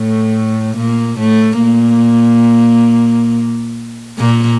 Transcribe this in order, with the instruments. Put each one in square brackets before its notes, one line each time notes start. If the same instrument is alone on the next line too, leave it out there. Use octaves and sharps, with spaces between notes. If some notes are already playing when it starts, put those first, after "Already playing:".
Already playing: [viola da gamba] A2 A3
A#2 A#3
A2 A3
A#2 A#3
A#2 A#3